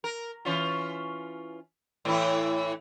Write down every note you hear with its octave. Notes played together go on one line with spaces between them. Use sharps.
A#4
E3 C#4 F4
A2 E3 E4